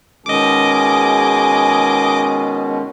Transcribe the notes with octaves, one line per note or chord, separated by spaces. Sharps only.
B2 D#3 G#3 C#4 G#4 D#5 D6